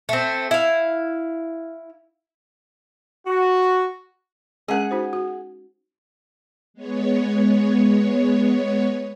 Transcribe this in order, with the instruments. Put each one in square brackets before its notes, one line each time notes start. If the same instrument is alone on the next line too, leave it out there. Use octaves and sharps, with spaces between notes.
[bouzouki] A3 C4
E4 F5
[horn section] F#4
[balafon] G#3 C#4 A#4 [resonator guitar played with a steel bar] G#4 F#5
[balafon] D#4 F#4 C5
F#4
[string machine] G#3 B3 C#5